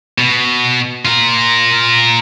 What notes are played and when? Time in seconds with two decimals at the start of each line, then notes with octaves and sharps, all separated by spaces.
0.18 B2
1.05 F4 A#4